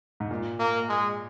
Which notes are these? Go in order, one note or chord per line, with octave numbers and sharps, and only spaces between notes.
G#2
A#2
A#3
G#3